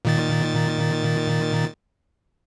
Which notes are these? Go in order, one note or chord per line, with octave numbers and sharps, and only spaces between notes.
A#2 D#3 A6